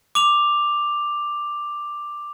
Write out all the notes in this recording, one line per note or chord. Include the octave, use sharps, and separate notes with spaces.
D6 F7